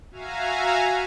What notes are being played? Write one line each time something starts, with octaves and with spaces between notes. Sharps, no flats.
F#4 E5 F5 G#5 A#5